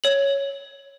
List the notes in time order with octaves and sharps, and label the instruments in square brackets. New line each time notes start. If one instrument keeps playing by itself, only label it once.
[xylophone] C#5 F#7